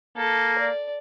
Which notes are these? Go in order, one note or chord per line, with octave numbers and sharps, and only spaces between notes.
A#3 A4
D5